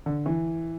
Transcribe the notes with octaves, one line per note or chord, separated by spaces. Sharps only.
D3
E3